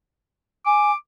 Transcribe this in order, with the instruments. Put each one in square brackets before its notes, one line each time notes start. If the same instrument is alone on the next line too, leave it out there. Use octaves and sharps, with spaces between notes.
[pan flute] G#5 [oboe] D6